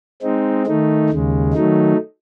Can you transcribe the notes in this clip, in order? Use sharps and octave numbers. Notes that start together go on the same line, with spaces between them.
G#3 C4 D#4
D#3 A3 D#4
D#2 C#3 G#3
D#3 F#3 A3 D#4